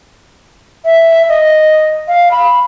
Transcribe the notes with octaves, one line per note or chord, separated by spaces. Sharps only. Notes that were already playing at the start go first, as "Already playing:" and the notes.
E5
D#5
F5
B5